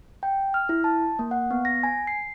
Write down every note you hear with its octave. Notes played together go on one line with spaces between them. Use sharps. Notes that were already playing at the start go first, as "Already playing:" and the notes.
G5
F6
E4
A5
A#3
F#5
B3
A#6
G#5
C7